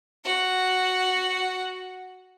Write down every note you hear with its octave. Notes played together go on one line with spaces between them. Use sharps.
F#4 F#5